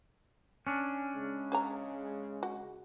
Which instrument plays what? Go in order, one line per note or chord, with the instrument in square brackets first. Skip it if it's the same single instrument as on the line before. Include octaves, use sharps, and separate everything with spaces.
[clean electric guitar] C#4 D4
[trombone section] C#3 G#3
[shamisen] G#4 C#5 A#5
F#4